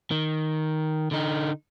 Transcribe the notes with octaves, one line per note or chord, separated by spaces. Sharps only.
D#3
D3 D#4